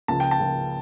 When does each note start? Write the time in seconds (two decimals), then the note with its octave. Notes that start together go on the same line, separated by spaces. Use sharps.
0.08 C#2 C#3 F3 A#3 A5
0.20 G5
0.31 A5
0.40 C#2 C#3 F3 A#3